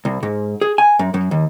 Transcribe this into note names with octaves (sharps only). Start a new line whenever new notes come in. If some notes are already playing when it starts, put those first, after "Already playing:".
C2
G#2
G#4
G#5
F#2
F#2
D#2